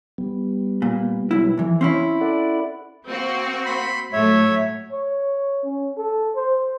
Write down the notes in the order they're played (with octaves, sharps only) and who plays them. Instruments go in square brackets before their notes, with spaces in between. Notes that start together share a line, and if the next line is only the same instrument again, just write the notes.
[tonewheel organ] G3 B3
[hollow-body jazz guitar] A#2
B1 E4
F2 E3
C4 C#4 E4
[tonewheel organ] A4 D5 F#5
[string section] A#3 C4 F#4
[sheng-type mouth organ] B5 C6
[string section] A2 F#3 A3 [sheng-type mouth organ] C#5 E5
[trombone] C#5
C#4
A4
C5